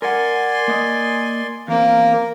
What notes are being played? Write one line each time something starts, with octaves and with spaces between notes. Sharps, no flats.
A#4 D5 F#5 G#5 C6
A#3 D#5
E2 A#3 C4 A#4